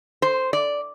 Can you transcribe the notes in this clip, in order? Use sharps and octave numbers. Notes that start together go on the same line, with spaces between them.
C5
D5